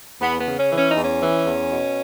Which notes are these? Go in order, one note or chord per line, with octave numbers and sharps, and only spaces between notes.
E2 B3
B3
C#3
C#4
E3
C#4
D#4
E2
C#4
E3
E2
B2